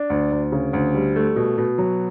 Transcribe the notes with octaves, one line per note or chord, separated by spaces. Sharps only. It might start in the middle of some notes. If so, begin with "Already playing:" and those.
Already playing: D4
D2
D2
C#3
D2
G3
A3
B2
B2
F#3